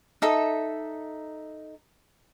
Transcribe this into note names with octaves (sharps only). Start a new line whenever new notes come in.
D#4 A4 E5